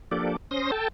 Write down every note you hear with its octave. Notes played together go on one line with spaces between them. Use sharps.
F3 A#3 D4 G4 A4 D5
C#4 C5 C6 D#6 A#6
A4 G5 A5